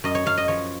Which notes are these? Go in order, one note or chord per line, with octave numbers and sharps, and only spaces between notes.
F#2 D#5
C#5
F#2 F5
D#5
F3 C#5